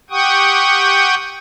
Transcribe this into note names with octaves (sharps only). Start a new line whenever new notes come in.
G4 F#5 G5 C#6 D#6